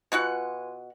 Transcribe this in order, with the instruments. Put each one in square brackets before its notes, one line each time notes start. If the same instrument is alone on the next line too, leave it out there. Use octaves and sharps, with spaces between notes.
[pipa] B2 F#4 F#5 [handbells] F4 B4 G#5